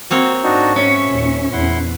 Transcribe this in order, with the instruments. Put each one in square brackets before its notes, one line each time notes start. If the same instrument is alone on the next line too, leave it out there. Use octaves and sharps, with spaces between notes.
[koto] A#3 C4 C#5 [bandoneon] F#4 C5
[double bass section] G#2 [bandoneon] D4 D#4 F#4
[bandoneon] F#2 E5 [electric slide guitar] C#4
[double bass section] D#2 A#2
[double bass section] E2 [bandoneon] E4 F#5 C6